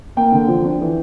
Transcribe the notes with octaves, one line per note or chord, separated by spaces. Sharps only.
A#3 G5
D3
F3
D4
E3